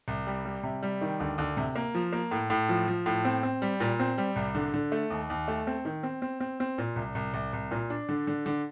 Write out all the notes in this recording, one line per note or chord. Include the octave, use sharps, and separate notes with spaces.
C2
G3
G3
C3
G3
D#3
D2
D2
C3
A#3
F3
A#3
A2
A2
F3
F3
A2
C4
C4
G3
A#2
C4
G3
C2
D3
D3
A3
D#2
D#2
A3
C4
D#3
C4
C4
C4
C4
A#2
C2
C2
C2
C2
A#2
D4
D3
D3
D3